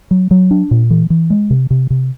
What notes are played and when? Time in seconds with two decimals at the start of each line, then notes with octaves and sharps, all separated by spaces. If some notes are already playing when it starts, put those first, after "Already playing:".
0.11 F#3
0.31 F#3
0.51 D4
0.71 A#2
0.90 E3
1.10 E3
1.30 G#3
1.50 C3
1.70 C3
1.90 C3